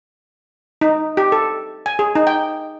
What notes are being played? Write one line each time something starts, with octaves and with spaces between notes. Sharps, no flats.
D#4
G4
A4
G#5
G#4
D#4
G5